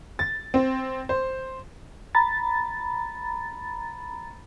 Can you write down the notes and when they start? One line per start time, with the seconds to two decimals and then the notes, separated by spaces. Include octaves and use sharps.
0.19 A6
0.54 C4
1.09 C5
2.15 A#5 B5 A6